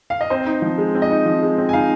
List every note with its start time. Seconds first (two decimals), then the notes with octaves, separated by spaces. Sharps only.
0.10 F5
0.21 D#5
0.30 C4 C5
0.46 D#4
0.62 F3
0.78 G#3
0.95 C4
1.02 D#5
1.11 D#4
1.26 F3
1.42 G#3
1.58 C4
1.69 G#5
1.73 D#4 F5